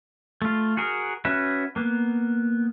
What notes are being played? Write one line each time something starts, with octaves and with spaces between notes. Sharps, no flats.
A3 F4
F#4 G#4 A#4
C#4 F#4 B4 E5
A#3 B3